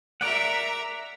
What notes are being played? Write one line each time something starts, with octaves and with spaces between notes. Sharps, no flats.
A#4 D5 E5 F#5 A#5